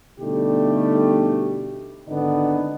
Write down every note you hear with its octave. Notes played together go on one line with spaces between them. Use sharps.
B2 D3 G3 A3 D#4 G4
G#1 D3 B3 D4 D#4 D#5